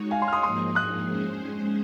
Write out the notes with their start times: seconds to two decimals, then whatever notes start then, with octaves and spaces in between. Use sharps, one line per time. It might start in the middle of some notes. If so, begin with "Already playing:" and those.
Already playing: G#3 D#4 F#4 C#5
0.11 F5 G#5
0.21 G#5 C6
0.28 F6
0.33 C6 D#6
0.43 G#2 F3 A#3 D#4 G#4 C6 D#6
0.75 D#6 F#6
1.08 G#3 C#4 G#4 C5